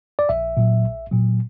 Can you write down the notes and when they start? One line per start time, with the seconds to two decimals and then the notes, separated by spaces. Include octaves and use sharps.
0.19 D5
0.29 A#1 E5
0.57 A#2 F#3
0.84 A#1
1.11 A#2 F#3